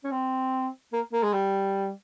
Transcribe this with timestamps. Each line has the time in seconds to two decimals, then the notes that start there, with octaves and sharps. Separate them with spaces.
0.04 C#4
0.11 C4
0.93 A#3
1.13 A#3
1.23 G#3
1.34 G3